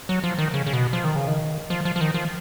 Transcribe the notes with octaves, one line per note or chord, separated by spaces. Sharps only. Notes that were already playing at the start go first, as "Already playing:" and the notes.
F#3
F3
D#3
C#3
C#3
B2
F3
D#3
C#3
D#3
F3
F3
F3
D#3
F3